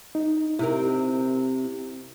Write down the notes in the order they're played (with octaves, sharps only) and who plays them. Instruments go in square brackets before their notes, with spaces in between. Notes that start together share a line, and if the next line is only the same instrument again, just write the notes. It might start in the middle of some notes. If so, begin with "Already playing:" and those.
[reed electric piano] D#4
[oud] C3 C4 A#4 [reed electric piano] E4